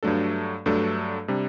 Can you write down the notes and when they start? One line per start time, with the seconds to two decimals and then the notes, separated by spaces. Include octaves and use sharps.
0.03 G2 F#3 A3 D4 A4
0.66 G2 F#3 A3 D4 A4
1.28 C3 G3 D4